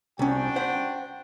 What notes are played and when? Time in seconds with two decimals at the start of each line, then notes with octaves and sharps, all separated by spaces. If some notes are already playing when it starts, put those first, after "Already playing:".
0.19 C2 C#4 D4 F#4 G5
0.56 C5 F#5